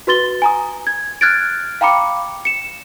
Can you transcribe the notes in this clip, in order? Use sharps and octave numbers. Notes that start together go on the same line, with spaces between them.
F#4 B4 C6 A6 G7
G#5 A#5 D#6
G#6
F6 F#6 G#6 A6 D7
F5 G5 A#5 B5 D6 C#7
C#7 E7